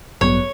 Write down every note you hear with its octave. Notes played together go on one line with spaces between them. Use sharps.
A1 G2 F#3 B3 C#5